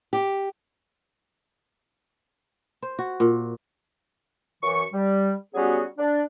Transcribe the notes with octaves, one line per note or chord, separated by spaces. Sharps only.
G4
C5
F#4
A#2
F#2 E3 C#6
G3
F#3 G3 B3 C#4 F#4 G#4
D4